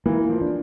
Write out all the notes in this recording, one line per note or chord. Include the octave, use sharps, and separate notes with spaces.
E3 A#3
F3
D4